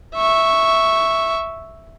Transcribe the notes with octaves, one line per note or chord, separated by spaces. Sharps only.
E5 C#6